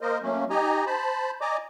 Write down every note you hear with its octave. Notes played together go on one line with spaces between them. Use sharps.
A#3 A#4 C5 D#5
F#3 A3 A#3 C#4
D#4 G4 D#5 G#5 A#5
C5 A5 B5
D5 D#5 G#5 A#5 D6